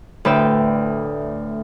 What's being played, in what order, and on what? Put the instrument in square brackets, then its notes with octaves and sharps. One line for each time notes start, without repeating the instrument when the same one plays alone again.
[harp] D2 A2 B4 D5 G5 E6